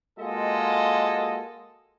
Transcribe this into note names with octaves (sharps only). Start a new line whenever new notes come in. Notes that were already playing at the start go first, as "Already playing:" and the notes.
G#3 A#3 F4 F#4 A4 D#5